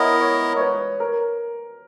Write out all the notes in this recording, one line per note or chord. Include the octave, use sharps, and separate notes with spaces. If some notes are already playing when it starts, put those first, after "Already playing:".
Already playing: B3 E4 A#4 C#5 D#5
C#5
C#5
B4
A#4